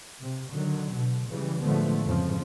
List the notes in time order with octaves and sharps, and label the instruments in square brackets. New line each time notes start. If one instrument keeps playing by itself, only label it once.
[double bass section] C3
D3 D#3 F#3
B2 D3
C#3 E3 G3
A1 D3 F3 G#3 A3 B3
F2 G#2 C#3 F3